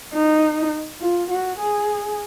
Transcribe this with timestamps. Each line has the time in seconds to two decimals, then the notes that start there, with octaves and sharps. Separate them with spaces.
0.13 D#4
1.01 F4
1.30 F#4
1.60 G#4